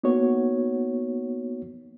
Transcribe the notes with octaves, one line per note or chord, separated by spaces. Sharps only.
A#3 B3 D#4 F#4 C#5